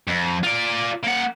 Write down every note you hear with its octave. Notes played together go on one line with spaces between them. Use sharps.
F2
F4 D5
A#3 F#5